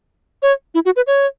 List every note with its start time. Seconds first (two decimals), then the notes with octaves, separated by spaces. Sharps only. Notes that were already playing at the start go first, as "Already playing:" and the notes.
0.42 C#5
0.75 E4
0.85 F#4
0.96 B4
1.07 C#5